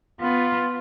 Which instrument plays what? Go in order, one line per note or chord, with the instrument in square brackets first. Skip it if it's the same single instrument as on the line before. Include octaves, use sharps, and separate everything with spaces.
[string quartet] B3 [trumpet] F4